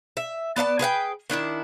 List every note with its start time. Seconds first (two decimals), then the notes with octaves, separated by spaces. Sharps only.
0.17 E5
0.56 B3 D5 E5 A5
0.79 G#4 B4 F#5 G5
1.30 D#3 D4 E4 A5